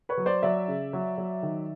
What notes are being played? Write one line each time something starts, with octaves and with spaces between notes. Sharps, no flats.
B4 C#5
F#3
C5 D5
F#3 D5 E5
C#3
F#3
F#3
D#3